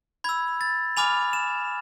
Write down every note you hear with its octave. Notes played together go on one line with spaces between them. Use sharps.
B5 E6 G#6
A6
G#5 B5 D6 F6 F7
E7